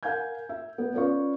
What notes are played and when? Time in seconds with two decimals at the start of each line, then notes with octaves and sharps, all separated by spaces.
0.03 A#4 F5 F#5 G#5 G6 G#6
0.49 E5
0.78 B3
0.94 C#4 F4 B4 D5 F5 C#6